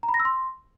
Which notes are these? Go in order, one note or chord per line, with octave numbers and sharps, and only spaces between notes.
A#5
B5
A#6
E6
C6